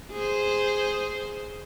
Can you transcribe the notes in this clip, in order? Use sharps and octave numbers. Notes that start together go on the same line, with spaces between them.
G#4 C5